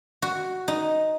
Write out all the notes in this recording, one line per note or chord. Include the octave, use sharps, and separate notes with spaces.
F#4
D#4